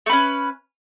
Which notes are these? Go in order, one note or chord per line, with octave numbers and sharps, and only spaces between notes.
A3 C#4 B4